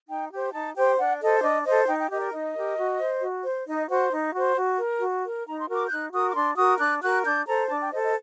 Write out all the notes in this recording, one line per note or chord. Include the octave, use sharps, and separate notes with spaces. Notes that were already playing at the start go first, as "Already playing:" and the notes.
D#4 G5
G4 C5
D#4 A5
G4 C5 G5
D4 F#5
A4 C5 D#5
D4 D#5
A4 C5 D#5
D#4 G5
G5
G4 A#4 D#5
D5
D#4 D#5
G4 A#4
F#4
C5
F#4
C5
D#4 D#5
F#4 C5 F#5
D#4
F#4 C5
F#4
A#4
F#4
A#4
D#4 A#5
C6
F#4 A#4
D6
G6
D#4 F#6
F#4 A#4 D#6
D6
D4 C6
F#4 A#4 D#6
D4 F#6
F#4 A#4 F#6
D4 G6
A4 C5 A#5
D4 A5
G5
A4 C5 D#5
D#5